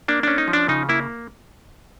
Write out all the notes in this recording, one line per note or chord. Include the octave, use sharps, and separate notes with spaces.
A#3 D4
C#4 D4
D#4
F3
D4
C#3 D#4
A#3 E4